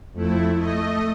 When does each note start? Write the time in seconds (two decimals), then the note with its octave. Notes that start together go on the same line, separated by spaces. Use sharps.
0.13 F2 A3 E4
0.57 A3 D#5